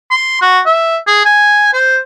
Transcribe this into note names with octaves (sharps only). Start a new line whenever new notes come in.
C6
F#4
E5
G#4
G#5
C5